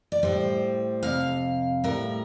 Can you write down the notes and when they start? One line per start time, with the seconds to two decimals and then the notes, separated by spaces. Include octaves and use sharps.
0.12 D5
0.23 A2 G3 C5
1.03 F2 C3 F5
1.84 A2 G3 A#4